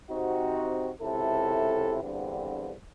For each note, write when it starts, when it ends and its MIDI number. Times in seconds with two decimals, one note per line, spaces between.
0.10 0.91 48
0.10 0.91 60
0.10 0.91 63
0.10 0.91 66
1.02 1.98 37
1.02 1.98 48
1.02 1.98 64
1.02 1.98 69
2.04 2.73 40
2.04 2.73 43
2.04 2.73 50
2.04 2.73 59
2.04 2.73 60